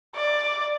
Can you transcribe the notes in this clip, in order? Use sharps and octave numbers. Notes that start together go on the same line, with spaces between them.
D5